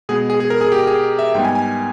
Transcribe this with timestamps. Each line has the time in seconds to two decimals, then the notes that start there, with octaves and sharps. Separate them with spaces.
0.09 B2 G#3 B3 G#4
0.30 G#4
0.40 G#4
0.50 A#4
0.61 G#4
0.72 G4
0.87 G#4
1.19 E5
1.35 G#2 G3 B3 G5
1.45 G#5
1.55 G#5